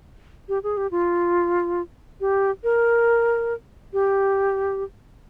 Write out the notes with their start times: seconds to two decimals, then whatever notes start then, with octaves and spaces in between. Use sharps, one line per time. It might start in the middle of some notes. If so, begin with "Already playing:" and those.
0.49 G4
0.64 G#4
0.77 G4
0.91 F4
2.21 G4
2.64 A#4
3.93 G4